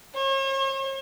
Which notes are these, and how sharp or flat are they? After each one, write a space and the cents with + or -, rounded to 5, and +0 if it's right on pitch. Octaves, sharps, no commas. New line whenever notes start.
C#5 -45